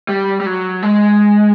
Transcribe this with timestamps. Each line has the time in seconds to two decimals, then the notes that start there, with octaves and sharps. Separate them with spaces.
0.09 G3
0.40 G3
0.46 F#3
0.82 G#3